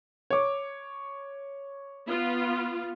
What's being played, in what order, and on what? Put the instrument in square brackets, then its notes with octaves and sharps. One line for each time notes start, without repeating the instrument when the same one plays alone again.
[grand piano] C#5 D6
[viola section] B3 F4